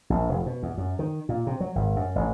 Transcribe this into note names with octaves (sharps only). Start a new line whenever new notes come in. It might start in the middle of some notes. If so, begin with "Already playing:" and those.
A#1
F1
B2
E2
F#2
D#3
A#2
C3
F#3
G#1
F#2
A1